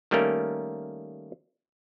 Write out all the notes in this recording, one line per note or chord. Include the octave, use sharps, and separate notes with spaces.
D#3 G3 A3 A#3 C#4 A#4